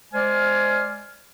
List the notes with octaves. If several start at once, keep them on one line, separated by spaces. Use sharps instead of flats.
G#3 C5 D5 G#5 F6